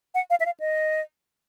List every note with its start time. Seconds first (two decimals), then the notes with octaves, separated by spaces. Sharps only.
0.14 F#5
0.30 F5
0.40 E5
0.46 F5
0.60 D#5